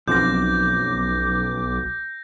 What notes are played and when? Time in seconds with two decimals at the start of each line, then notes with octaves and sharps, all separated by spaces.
0.08 B1 F#2 F3 C4 D6 G6 A#6